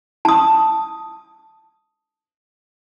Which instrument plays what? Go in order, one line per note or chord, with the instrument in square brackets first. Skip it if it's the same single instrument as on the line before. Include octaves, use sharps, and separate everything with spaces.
[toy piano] A5 D#6